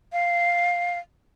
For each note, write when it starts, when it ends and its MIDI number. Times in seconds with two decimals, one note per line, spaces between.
0.13 0.98 77